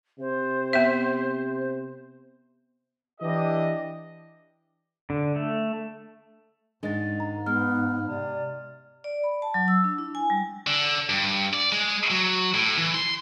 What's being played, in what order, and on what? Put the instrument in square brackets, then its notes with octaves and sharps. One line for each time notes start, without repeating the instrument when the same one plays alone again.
[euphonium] C3 [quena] C5
[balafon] B3 E5
[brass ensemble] E3 D4 E4 G4 D#5
[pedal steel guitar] D3
A3
[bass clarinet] G#2 [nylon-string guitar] D#3 G#3 [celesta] D4 D#5 A6
[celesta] A#5
[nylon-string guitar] G#3 [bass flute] B3 [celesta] F6
[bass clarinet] C3 [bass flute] D5
[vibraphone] D5
B5
A5
F#3
E6
D4
E4
G#5
G3
[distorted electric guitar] D3
G2
D5
G#3
F#3
A2
E3
C6